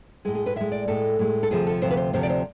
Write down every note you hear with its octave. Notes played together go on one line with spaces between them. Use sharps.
A2 G#3 G#4
G#4
B4
A2 G#3 E5
D5
A2 G#3 A4
A2 G#3
A4
D2 C3 F3 G#4
A4
D2 C3 F3 C5
B4
C5
D2 C3 F3 C5
D5
C5